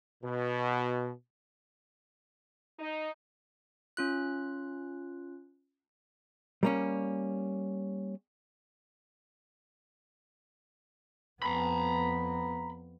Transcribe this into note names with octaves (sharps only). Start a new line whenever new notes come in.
B2
D#4
C#4 F4 F#6
G3 A#3 C#4
F2 B3 A#5 B5